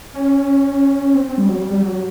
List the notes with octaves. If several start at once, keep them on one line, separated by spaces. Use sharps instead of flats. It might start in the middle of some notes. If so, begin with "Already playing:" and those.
C#4
C4
G3
F#3
G3
G3
F#3